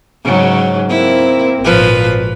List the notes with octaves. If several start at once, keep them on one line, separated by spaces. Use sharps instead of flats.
G#2 C#3 F#3
A#3 C4 E4
G#1 A#2 F3 B4